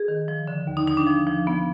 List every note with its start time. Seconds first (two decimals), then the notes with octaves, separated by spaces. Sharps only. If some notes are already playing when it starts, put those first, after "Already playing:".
Already playing: G#4
0.08 D#3
0.28 F3
0.48 D3
0.67 D#2
0.77 D#4
0.87 D#2 D#4
0.97 D4
1.07 F3
1.27 F3
1.47 F3 B3